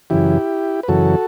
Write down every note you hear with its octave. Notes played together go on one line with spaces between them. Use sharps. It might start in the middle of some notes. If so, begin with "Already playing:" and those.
F#2 C#3 E3 E4 G4
B4
F#2 C#3 E3 F#4 A4